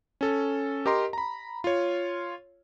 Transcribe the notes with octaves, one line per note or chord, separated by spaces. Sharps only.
C#4 A4
G4 A#4 D#5 A#5 C6
A#5 B5
F4 C#5